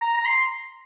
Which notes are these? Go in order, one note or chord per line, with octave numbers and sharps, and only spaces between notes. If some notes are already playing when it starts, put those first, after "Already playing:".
A#5
A#5
C6